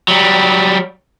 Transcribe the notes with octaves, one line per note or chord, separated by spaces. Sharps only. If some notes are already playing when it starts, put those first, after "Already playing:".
F#3 G3